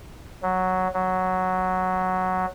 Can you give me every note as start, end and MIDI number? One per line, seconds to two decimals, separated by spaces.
0.43 0.88 54
0.94 2.46 54